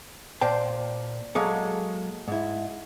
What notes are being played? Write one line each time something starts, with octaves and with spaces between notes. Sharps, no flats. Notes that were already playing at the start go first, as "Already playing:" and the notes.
A#2 C5 G5 A5
F#3 G#3 A#3 G#4 A4
G#2 E4